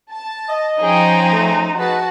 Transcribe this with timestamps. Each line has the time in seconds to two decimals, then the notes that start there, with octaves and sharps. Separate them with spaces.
0.11 A5
0.49 D#5
0.81 F3 C#4 D#4 G#4 C5 G5
1.32 A3
1.79 D#4 F#4 G#4 B4 A5